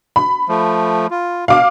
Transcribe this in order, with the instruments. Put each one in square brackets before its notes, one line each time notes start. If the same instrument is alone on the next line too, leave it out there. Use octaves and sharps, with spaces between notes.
[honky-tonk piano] B5
[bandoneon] F3 A3
F4
[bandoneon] B2 [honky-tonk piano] F5 D6